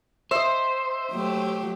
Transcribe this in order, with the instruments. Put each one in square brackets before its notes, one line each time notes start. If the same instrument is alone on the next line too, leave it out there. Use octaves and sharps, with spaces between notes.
[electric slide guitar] C5 [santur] D#5 E5
[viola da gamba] F#3 A3 G4